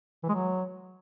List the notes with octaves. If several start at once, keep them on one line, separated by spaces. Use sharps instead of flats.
E3
G#3
F#3